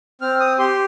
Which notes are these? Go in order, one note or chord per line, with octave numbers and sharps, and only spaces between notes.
C4 F6
D#6
G4 C6